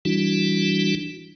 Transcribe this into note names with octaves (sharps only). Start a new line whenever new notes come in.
E3 G3 D4 E4 F#4